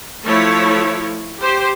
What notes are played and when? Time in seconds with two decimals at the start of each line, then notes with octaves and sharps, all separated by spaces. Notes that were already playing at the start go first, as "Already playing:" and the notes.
0.24 F3 A3 E4 C#5
1.41 G4 C5